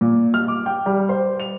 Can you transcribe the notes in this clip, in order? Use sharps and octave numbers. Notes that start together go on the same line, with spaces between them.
A#2
F6
D6
G5
G3
C5
F7